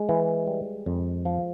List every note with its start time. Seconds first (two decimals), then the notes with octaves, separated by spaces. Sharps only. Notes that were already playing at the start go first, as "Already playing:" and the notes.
Already playing: G#3
0.09 E3
0.47 G3
0.86 F2
1.25 F3